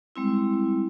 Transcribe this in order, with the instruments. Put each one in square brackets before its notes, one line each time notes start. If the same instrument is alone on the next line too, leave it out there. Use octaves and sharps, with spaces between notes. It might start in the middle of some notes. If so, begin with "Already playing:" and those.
[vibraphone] G3 G#3 C4 E4